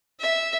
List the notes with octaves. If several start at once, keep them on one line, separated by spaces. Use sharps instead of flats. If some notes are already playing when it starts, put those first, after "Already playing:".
E5